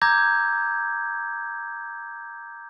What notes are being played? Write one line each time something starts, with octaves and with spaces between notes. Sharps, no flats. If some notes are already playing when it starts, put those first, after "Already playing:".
A#5 D6 E6 G6 G#6 A#6